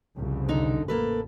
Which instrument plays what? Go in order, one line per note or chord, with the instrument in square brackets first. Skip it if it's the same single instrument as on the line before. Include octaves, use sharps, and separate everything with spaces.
[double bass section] C2 F2 C#3
[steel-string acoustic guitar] D3 D#4
[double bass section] A1 [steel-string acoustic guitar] A#3 A4 B4